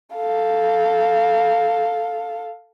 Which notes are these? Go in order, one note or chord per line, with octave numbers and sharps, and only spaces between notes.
A4 F5